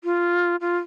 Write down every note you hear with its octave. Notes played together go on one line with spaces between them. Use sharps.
F4
F4